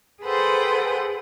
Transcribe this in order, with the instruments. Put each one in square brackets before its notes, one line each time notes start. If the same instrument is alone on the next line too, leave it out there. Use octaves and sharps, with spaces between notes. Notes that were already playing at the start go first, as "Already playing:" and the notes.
[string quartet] G#4 A4 B4 C5 F#5 G5